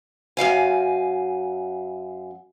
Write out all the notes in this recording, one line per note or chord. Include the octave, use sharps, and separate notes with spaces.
F#2 E3 F5 G#5